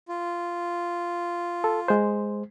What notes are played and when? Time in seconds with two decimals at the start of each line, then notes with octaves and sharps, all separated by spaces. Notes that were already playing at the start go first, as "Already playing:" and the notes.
0.09 F4
1.64 A4
1.88 G#3 C5